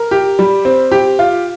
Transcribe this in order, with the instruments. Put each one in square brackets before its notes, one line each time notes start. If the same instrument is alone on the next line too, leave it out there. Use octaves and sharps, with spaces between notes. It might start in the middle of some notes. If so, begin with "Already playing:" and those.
Already playing: [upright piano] A#4
G4
G3
C4
G4
F4